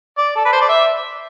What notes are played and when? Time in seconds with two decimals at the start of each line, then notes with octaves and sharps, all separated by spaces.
0.18 D5
0.36 A4
0.45 B4
0.53 C5
0.61 D5
0.69 E5